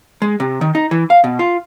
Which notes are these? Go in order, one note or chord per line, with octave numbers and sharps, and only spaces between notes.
G#3
C3
D#3
D#4
E3
F5
B2
F4